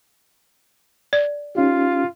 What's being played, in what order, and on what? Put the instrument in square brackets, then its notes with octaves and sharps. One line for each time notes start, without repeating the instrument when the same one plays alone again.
[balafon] D5
[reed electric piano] C#4 D#4 G4 [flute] F4